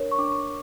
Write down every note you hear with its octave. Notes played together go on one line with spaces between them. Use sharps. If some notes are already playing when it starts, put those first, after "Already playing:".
Already playing: D4 A#4 C#5
C#6
D4 D6